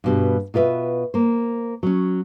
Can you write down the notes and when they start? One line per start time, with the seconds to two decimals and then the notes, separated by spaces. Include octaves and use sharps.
0.04 G2 B2 G3
0.54 B2 F4 B4 D5 E5
1.14 A#3 C5
1.83 F#3 C#4